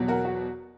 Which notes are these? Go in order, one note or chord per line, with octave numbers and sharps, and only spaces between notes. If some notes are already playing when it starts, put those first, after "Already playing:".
Already playing: E2 B2 F#3
F#4 A#4
F#4